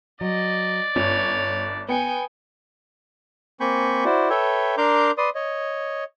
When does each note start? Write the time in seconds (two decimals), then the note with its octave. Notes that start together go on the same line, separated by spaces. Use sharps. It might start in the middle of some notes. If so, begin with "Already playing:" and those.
0.21 F#3 D5 D#5
0.96 G1 C#4 C#5
1.88 B3 G5 G#5 C#7
3.60 A#3 C4 G#5 B5 C#6 G6
4.05 E4 F#4 C5 D5
4.30 A4 B4 C#5 E5 G5
4.78 D4 A#4 A#5 C6 D6 G6
5.18 B4 D5 C6 D#6
5.35 C#5 D#5